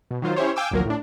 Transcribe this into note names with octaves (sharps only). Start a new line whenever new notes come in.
B2
D#3 F#3 F4 C5
C#4 E4 G4 C5 C#5
F5 G5 G#5 D6 E6
A1 D2 F3 F#3 A#3 A#4
A2 D4